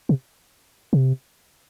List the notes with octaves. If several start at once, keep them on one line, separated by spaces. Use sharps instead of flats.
C3
C3